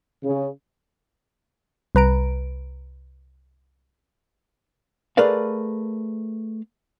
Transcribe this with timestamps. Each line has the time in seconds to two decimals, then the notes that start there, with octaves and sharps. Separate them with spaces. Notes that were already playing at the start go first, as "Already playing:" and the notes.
0.24 C#3
1.95 C2 B4 A#5 D7
5.17 A3 G#4 A#4 B4 D5 F5